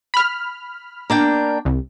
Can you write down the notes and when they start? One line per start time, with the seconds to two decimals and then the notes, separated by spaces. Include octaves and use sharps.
0.14 B5 F6
1.10 A#3 D4 G5
1.65 C2